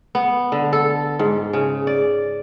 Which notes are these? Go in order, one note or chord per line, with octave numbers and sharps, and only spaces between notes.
B3
D3
A4
G#2
C#3
D5